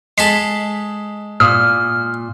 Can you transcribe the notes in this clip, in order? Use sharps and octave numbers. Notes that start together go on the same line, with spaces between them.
G#3 G#4 A4 B6
A#2 D#6 F6